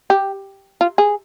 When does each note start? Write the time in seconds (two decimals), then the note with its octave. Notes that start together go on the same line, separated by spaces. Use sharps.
0.10 G4
0.81 F4
0.98 G#4